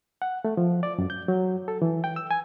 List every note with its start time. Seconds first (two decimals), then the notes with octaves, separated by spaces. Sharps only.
0.22 F#5
0.45 A3
0.57 F3
0.83 D5
0.98 F#2
1.10 G6
1.28 F#3
1.68 A4
1.82 E3
2.04 G5
2.16 E6
2.31 G#5